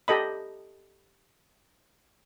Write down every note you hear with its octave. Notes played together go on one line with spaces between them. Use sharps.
G4 A4 D#5 B5